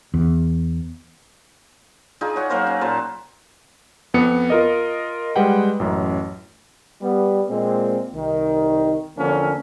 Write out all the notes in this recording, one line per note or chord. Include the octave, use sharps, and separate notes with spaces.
E2
D4 D#4 F4 G#4
C#5 F#5
F#3 A#3 A#4 C5
C#4
A#2 C5 A5 B5
F2 B3 C#7
F4 A#4 D#5
G3 G#3 B4 D#5 F#5 G5
A1 F#2
G3 B3
A#2 G#3 C4
C2 D#3
E2 D3 F3 A#3 C4 C#4